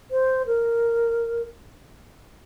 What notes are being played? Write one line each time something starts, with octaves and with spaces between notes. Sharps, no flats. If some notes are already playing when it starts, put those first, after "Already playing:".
C5
A#4